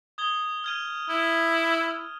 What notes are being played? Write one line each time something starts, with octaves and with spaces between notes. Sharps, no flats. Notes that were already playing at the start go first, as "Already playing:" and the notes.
D#6 G#6 G7
F6 G#6 D#7
E4